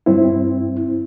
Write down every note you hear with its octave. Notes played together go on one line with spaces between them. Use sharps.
G2 C4 E4